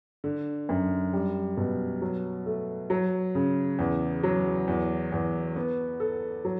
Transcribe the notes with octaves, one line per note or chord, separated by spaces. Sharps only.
D3
F#2
G3
B2
F#3
A3
F#3
C#3
E2
F#3
E2
E2
B3
A4
F#3